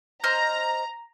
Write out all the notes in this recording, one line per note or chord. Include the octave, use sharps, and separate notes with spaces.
C5 D#5 A#5 F6